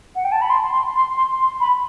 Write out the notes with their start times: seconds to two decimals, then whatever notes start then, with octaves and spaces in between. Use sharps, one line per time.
0.16 F#5
0.24 G5
0.32 A5
0.42 B5
0.50 C6
0.72 C6
0.95 C6
1.17 C6
1.39 C6
1.60 B5